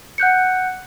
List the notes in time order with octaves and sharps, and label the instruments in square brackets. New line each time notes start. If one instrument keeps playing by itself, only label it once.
[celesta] F#5 F#6 G6 C#7